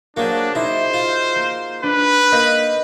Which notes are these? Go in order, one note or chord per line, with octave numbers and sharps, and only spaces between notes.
F#3 A#3 D4 F#4 G#4 C5
D#4 E4 C5
F4
A#3
D4 B4
A#3 D#5 G6 B6